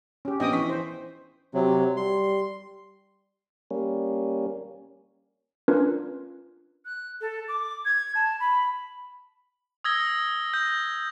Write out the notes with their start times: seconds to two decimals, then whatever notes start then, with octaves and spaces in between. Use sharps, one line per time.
0.25 C#4 G4
0.40 A#1 B3 C#4 D#5 G5 D#6
0.52 E3 C#6 B6
0.70 C5
1.54 C3 F#3
1.97 G3 C6
3.71 G3 A#3 C#4
5.68 C#4 D4 F4 A#4 B4
6.85 F#6
7.21 A4
7.48 D6
7.85 G#6
8.15 A5
8.40 B5
9.84 D#6 E6 G#6 A#6 G7
10.54 G6 A#6